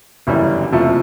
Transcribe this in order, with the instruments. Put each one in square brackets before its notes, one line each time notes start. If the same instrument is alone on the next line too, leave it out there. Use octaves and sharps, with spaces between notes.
[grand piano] G1 F#2 C#3 E3 G3
F#1 F2 C3 F3 A3